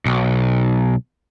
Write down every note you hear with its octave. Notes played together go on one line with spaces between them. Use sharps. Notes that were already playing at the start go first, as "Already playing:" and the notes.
B1